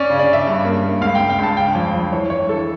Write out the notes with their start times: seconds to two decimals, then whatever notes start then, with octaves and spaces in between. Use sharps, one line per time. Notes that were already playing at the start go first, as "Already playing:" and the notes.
Already playing: C#4 D5
0.10 C#3
0.19 D5
0.28 C#3 E5
0.47 G2
0.65 A#3
0.83 A#3
1.01 C#2 F5
1.15 C#2 G5
1.30 G5
1.39 C#2 A5
1.57 C#3 G5
1.75 F2
1.94 F2
2.13 E3 C#5
2.30 E3 C#5
2.49 E3 A4